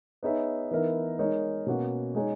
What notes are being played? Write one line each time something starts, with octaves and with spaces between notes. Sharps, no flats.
B3 D#4 G#4 C#5 E5
E3 B3 D#4 A#4 E5
G#3 D#4 A#4 C#5
B2 A#3 C#4 F#4
G#3 D#4 G#4 C#5